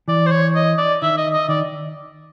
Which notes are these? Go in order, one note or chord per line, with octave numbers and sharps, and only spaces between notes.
E3 D5
C5
C#5
D#5
D5
D#3 E5
D#5
D#5
D#3 D5